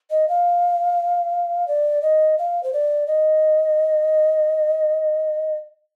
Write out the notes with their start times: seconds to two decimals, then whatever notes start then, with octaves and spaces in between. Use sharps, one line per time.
0.10 D#5
0.28 F5
1.67 D5
2.02 D#5
2.38 F5
2.63 C5
2.73 D5
3.07 D#5